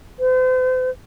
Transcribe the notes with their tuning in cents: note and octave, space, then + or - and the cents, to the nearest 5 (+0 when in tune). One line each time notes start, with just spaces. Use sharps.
C5 -40